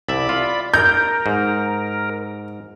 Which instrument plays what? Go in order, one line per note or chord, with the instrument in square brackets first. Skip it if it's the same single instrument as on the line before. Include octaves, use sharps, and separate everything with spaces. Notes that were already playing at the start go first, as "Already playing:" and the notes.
[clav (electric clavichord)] C2 E5 [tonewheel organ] D5 B5
[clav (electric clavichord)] F4
[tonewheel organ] A#4 [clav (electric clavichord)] A#5 [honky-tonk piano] G6
[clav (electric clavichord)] G#2